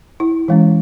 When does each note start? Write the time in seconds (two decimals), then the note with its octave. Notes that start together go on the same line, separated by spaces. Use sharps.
0.20 E4
0.48 E3 G#3 C#4